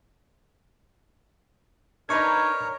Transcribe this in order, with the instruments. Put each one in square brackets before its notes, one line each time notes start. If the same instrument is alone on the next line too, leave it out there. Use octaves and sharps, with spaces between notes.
[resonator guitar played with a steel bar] D4 D#4 B4 [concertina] A#4 C#5 [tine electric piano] A#5 C#6 G#6